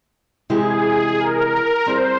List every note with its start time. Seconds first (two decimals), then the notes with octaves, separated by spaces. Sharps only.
0.50 C3 E3 G#3 E4 G4 G#4
1.18 A#4
1.86 G3 C4 E4 G#4 C5